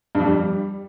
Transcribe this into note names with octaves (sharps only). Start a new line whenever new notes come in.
G2
F2
G3